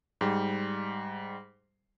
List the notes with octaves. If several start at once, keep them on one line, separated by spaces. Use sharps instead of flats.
G#2 G3